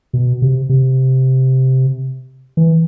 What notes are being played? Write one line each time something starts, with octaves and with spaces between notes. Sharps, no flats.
B2
C3
C3
E3